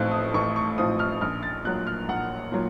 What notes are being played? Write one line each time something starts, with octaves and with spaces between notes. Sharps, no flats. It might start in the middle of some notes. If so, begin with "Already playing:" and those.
Already playing: A1 A2 F3 C4 F4 F#6
D#6
A1 C#6
C#6
A2 F3 C4 F4 D#6
F6
A#1 F6
A6
A#2 F#3 F#6
F6
A#1 F#5
A#2 F#3